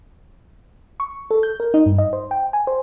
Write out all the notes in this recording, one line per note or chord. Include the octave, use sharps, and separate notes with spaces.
C#6
A4
G6
A#4
D#4
G2
D#5
C5
G5
G#5
C5